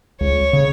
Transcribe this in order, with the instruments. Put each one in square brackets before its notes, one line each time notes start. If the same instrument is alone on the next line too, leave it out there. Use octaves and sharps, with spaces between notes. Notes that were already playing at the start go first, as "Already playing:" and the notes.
[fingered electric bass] C#2 [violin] C#5
[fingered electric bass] C#3